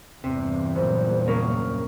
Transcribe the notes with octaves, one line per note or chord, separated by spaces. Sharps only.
E2 G2 C3
C#2 F#2 A#2 C5
F#2 C#3 A#3 A#4